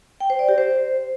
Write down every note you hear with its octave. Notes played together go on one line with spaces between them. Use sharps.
G5
C5
D5
G4
C5